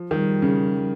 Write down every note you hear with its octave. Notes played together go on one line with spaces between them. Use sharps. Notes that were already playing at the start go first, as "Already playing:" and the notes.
Already playing: F3
D#3 G3
C#3